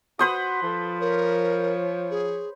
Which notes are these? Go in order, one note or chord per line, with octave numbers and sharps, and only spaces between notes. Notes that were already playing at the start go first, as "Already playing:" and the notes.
F#4 B4 C5 D#6
F3 A4
A#4 C#5
G#4